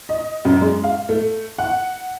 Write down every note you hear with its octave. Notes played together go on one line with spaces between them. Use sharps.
D#5
F#2
G#3
F5
A3
F#5